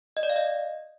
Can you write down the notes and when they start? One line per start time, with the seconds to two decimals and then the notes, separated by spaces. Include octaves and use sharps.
0.17 D#5
0.23 D5
0.29 F5
0.36 D#5